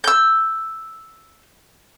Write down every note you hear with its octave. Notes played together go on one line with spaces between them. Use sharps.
E6 G6